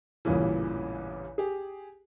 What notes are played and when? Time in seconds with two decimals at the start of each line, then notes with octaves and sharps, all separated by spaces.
0.25 A1 E2 G2 A#2 C#3 E3
1.38 G4 G#4